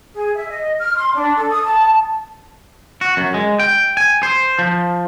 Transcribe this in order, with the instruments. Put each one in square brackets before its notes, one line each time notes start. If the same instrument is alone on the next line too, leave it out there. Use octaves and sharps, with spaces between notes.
[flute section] G#4
E5
D#5
F6
C6
D4
A4
D#6
A5
[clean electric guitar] F#4
F#2
G#3
G5
G#5
C5
F3